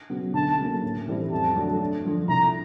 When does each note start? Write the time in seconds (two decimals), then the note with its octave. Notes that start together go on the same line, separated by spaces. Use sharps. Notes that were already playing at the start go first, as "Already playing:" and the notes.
0.10 C#3 F#3 B3
0.34 D2 A5
0.58 C#3 F#3 A#3
0.82 A2
1.08 E3 G3 C4 E4
1.32 F2 A5
1.56 D3 F#3 A3 D4
1.80 G2
2.05 D3 F3
2.28 C2 A#5